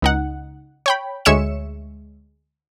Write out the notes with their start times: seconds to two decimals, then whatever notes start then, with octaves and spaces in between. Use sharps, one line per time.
0.02 C#2 D#4 F#5
0.86 C#5 G5 B5
1.25 D2 G#3 C#5 E5 C#7 E7